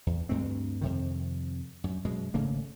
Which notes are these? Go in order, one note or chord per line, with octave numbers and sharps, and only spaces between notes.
E2
D2 G2 A3 C4
F2 C3 D#3
F#2
F#2 B2 G#3
G#1 C#3 A3 A#3